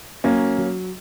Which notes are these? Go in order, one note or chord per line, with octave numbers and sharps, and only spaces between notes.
F#3 A#3 C#4
F#3